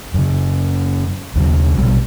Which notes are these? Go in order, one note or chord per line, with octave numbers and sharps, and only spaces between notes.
F#2 C#3
D#2 C#3 F#3
A#1 B2 G3